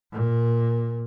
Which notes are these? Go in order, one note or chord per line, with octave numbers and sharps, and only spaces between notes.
A#2